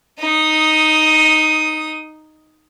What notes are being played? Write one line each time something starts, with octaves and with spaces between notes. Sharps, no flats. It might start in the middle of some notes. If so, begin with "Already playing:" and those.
D#4 D#6